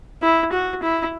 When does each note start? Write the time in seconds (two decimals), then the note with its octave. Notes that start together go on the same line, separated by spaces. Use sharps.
0.22 E4
0.52 F#4
0.83 E4